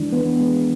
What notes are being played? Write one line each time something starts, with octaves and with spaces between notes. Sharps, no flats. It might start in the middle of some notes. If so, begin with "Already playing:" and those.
Already playing: E3 G#3 D4
B3
G#3